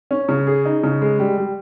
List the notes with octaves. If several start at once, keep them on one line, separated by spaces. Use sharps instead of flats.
C#4
C#3
G#4
D#4
C#3
G#3
G3
G3